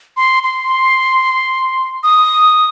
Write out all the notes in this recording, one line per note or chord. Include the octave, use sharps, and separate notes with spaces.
C6
C6
D#6